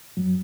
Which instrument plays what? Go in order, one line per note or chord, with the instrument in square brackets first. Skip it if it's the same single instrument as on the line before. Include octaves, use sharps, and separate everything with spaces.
[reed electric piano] F#2 F#3